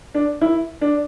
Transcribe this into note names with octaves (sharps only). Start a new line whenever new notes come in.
D4
E4
D4